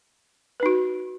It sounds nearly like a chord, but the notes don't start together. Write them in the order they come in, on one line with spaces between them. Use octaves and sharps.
B4 D#4 F#4